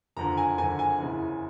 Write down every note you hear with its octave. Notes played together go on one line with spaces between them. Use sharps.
F#1 F2 D3 A#5
G#5
F#1 F2 D3 G#5
G#5
F#1 E2 C#3 E3